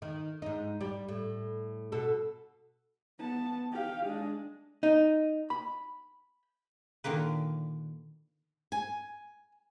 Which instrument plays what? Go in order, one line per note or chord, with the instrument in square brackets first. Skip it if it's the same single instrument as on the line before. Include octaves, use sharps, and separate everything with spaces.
[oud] D#3
G#2 D#4
G3
A2
B2 A4
[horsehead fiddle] B3 A5
G4 F5
G#3 D4
[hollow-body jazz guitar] D#4
B5
[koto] A#2 D3 D#3 A#3 B4
[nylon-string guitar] G#5